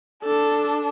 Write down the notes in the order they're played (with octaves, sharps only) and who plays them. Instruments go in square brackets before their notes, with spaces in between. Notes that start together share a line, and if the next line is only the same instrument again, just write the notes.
[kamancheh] D4 [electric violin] A4